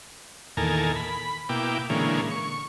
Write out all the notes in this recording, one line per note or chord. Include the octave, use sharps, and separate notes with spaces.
E2 A#2 D#3 A4 A#4 G#5
B5
B2 A#3 E4 G5 D6
A#2 D3 E3 G#3 A#3 C#4
C#6